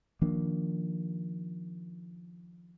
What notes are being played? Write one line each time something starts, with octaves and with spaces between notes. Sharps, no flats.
D#3 F3 A#3 D4